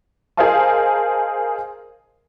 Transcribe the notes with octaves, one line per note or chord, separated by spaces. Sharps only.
G#4 A#4 C5 D#5 F5 A5